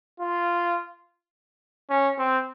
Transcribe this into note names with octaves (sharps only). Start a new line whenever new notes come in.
F4
C#4
C4